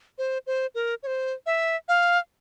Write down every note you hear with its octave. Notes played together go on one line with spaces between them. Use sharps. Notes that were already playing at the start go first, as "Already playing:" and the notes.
C5
C5
A#4
C#5
C5
E5
F5